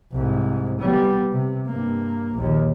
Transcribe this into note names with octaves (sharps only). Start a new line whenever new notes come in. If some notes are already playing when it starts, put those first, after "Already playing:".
C2 G#2
G3 B3
C3
G2 A#3
A#1 D#2